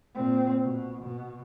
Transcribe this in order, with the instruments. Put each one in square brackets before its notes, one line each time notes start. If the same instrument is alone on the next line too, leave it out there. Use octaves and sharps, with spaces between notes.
[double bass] A#2 C4
B2
B2